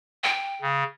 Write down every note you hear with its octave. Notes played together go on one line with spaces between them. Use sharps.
G5
C#3